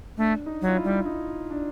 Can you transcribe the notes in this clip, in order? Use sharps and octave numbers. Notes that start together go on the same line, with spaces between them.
A3 D4
D#4
F#3
F4
E4
G3
D#4
D4